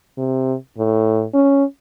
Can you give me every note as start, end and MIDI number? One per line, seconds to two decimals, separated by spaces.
0.17 0.55 48
0.78 1.25 45
1.34 1.64 61